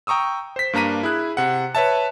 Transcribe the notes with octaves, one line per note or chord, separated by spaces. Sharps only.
G5 A#5 C#6 D#6 E6
C5 B6
G2 A#3 D4 A#5 B6 D#7
E4 G#4 F#6
C3 F#5
B4 C#5 E5 A5